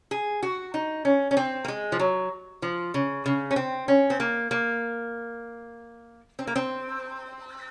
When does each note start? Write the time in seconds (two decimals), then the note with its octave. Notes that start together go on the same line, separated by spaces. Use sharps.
0.11 G#4
0.43 F#4
0.74 D#4
1.05 C#4
1.31 C#4
1.37 C4
1.65 A#3
1.68 G#3
1.92 F3
1.99 F#3
2.62 F3
2.94 C#3
3.26 C#3
3.51 C#4
3.56 C4
3.88 C#4
4.10 C4
4.20 A#3
4.51 A#3
6.39 C4
6.47 A#3
6.56 C4